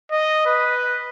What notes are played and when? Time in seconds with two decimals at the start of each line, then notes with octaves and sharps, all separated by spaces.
0.12 D#5
0.46 B4